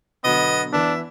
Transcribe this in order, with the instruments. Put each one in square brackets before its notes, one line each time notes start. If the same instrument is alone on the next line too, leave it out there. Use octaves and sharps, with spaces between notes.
[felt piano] B2 D3 F#3 [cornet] B3 [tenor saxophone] D#5
[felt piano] E3 B3 [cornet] D4 [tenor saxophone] E5